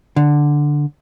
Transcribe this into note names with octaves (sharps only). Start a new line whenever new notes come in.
D3